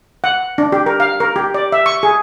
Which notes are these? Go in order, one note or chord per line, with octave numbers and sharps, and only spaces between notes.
F#5
D4
G4
A#4
F5
A#4
G4
D5
E5
C#6
G#4